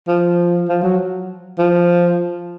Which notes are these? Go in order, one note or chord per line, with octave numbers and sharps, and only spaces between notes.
F3
F3
F#3
F3